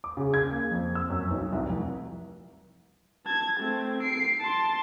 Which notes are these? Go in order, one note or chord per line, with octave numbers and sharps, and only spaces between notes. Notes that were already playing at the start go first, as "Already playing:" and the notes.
D6
C#3
G#6
A#3
F2
E6
F#2
B1
C2
F1
A5 G#6
A3 C4
C7 D7
A5 C6